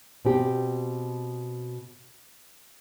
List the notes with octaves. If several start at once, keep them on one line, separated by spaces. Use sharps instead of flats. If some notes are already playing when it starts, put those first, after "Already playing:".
B2 C4 G4